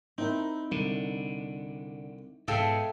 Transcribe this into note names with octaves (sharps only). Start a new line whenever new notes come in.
C4 D#4 E4 A#4
C2 D3
G#2 B2 G#4 A4 E5 F5 G5